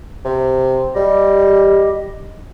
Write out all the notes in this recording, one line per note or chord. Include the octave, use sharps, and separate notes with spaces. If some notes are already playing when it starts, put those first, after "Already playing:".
C3
G3 G4 D#5